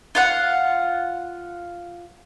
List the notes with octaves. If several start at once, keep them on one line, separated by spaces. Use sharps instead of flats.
F4 F5 F#5